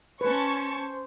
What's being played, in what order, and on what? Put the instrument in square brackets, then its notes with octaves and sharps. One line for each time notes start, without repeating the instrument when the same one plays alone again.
[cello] C#4 [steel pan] B4 [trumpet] C5 [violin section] A5 C#6